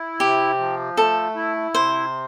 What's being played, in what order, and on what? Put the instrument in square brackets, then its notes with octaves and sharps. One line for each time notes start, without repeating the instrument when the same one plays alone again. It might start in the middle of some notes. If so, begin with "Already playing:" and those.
Already playing: [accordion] E4
[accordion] C3 [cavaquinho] G4
[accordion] F3
[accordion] A3 [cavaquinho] A4
[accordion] E4
[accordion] C3 [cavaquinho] C5